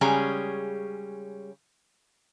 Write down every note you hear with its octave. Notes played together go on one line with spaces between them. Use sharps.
C#3 G3 G#3 C#4 G#4 A#5